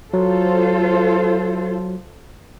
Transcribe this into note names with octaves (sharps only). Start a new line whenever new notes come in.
F#3 F4 A4 C5